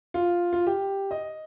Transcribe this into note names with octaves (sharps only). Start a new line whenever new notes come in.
F4
F4
G4
D#5